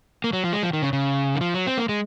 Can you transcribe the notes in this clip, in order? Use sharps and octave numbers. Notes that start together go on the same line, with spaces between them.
A#3
F#3
F3
G#3
F3
D#3
C#3
C#3
D#3
F3
F#3
C4
A#3
G#3